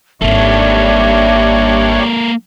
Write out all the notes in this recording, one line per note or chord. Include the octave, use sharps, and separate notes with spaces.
G#1 G3 A#3 D4 A4 C#5 E5